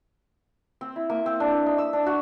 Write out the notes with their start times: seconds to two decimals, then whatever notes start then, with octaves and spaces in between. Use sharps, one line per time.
0.81 C4
0.96 E4
1.10 A#3
1.26 C4
1.40 D4
1.52 B4
1.66 D#4
1.78 E6
1.93 D4
2.06 F#4